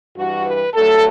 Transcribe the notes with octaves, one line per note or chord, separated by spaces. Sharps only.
G2 E3 G3 F#4
B4
G2 F#3 A3 A4